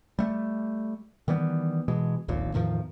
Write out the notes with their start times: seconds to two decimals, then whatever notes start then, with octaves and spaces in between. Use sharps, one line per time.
0.19 G3 A3
1.28 D#3 E3 G3 B3
1.88 B2 E3 G#3
2.28 D1 A#1 D#2 A#2
2.54 E2 A2 D#3 F3